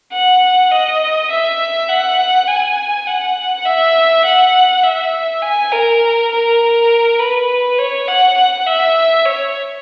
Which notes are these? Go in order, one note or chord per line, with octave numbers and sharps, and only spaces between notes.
F#5
D#5
E5
F#5
G#5
F#5
E5
F#5
E5
G#5
A#4
A#4
B4
C#5
F#5
F#5
E5
C#5